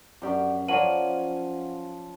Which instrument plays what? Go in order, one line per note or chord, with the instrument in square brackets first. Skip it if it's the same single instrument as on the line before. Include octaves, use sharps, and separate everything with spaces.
[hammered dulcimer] F#2 [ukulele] D4 G4 D5
[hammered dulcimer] F3 C#4 [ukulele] A#4 C#5 D5 [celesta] F#5 D#7 F#7